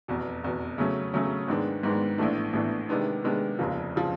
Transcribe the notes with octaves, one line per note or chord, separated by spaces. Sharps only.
F1 E2 B2
F1 E2 B2
C#3 F#3 A3 C#4
C#3 F#3 A3 C#4
G#2 D#3 G#3 B3 D4
G#2 D#3 G#3 B3 D4
A#1 A2 E3 A3 D4
A#1 A2 E3 A3 D4
C3 D#3 G#3 B3 D4
C3 D#3 G#3 B3 D4
F1 D#2 C#3 F3
C#3 F3